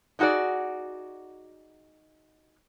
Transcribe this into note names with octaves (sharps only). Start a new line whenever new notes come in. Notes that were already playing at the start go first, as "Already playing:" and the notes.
D4 D#4 F#4 G#4 D5